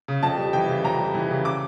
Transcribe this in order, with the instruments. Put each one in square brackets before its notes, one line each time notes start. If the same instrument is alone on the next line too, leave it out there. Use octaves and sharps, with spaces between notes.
[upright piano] C#3
F2 A5
G3
E3 G5
C#3
F2 A#5
G3
E3
C#3
D6